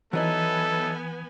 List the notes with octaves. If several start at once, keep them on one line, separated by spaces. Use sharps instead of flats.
E3 F#3 B3 D#4 E4 A4 G#5